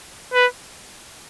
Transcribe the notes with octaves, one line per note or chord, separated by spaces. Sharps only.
B4